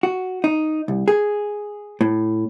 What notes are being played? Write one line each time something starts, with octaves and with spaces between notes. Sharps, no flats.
F#4
D#4
C2
G#4
A2